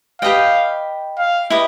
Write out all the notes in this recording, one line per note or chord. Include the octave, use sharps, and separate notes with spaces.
G4 B4 D#5 F5 G5
F5
E4 G4 B4 D#5